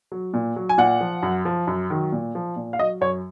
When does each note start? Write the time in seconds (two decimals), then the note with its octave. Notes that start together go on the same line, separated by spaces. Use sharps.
0.12 F#3
0.34 A#2
0.56 F#3
0.69 G#5
0.78 A#2 F#5
1.01 F3
1.23 F#2
1.45 F3
1.67 F#2
1.90 D#3 F#3
2.12 A#2
2.35 F3
2.56 A#2
2.73 F5
2.79 F#3 D#5
3.01 F#2 C#5